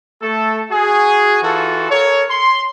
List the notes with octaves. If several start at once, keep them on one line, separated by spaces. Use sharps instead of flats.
A3 A4
F#4 G#4
E3 F4 F#4 A4
A4 A#4 C#5
C6